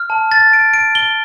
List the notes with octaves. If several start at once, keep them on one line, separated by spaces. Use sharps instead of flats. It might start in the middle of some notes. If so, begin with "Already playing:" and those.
Already playing: F6
A5
A6
D7
D7
G7